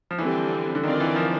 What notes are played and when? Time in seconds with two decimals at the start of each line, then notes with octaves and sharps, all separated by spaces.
0.11 F3
0.18 D3 E3 G3 C4
0.75 D3
0.83 D#3 C4 F4 A#4 D5
1.00 E3
1.16 F3